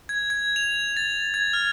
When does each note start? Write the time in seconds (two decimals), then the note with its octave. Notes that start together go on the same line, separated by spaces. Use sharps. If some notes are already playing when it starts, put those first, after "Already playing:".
0.09 G#6
0.30 G#6
0.56 F7
0.97 A6
1.34 G#6
1.53 F6